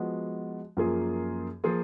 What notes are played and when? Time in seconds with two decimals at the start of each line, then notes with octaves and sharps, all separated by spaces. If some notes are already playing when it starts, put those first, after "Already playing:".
Already playing: F3 G#3 B3 F#4
0.77 F#2 F3 A#3 F4 G#4
1.64 F3 A#3 F4 G#4